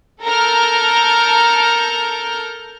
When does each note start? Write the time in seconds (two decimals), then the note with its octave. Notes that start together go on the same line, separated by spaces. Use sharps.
0.23 A4 A#4 A5 A#5 F6 G6